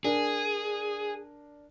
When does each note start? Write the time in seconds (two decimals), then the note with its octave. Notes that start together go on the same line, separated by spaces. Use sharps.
0.04 D4 G#4 A#4